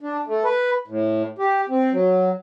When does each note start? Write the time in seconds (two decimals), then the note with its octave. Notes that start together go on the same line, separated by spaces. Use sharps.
0.01 D4
0.27 A3
0.45 B4
0.88 A2
1.38 G4
1.69 C4
1.92 F#3